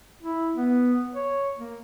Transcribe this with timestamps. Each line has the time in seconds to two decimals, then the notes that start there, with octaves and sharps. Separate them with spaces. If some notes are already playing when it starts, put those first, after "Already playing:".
0.23 E4
0.56 B3
1.15 C#5
1.57 A#3